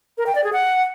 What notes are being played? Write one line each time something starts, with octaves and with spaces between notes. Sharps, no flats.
A#4
G5
D5
G#4
F#5